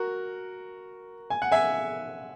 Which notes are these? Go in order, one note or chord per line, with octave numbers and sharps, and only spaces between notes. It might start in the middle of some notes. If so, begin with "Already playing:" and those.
Already playing: F#4 A#4
G#5
F#5
E5 G#5